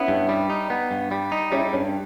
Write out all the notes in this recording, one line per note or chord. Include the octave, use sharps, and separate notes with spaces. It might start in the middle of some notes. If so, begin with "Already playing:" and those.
Already playing: B3 C#4 E4
G2
G3
D#4
B3
G2
G3
D#4
G3 C#4 E4
G2 C#4